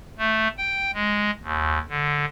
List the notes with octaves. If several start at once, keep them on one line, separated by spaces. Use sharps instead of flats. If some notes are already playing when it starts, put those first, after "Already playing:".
A3
G5
G#3
D#2
D3